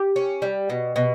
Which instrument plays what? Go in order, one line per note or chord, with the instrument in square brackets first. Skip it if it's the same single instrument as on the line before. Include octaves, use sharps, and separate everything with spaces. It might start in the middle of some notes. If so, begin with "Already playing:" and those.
Already playing: [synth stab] G4
[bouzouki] C#4
G3
B2
B2